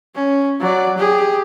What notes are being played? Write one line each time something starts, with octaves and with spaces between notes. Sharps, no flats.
C#4
F#3 D5
G4 G#4